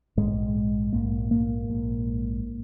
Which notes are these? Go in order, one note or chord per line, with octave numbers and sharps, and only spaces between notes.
A#1 G#2 G#3
A#1 G#2 A#3
A#3
A#1 G#2